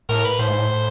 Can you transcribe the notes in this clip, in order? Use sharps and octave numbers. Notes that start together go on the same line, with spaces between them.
A2 A#4
B4
A2 C5
G#2
A2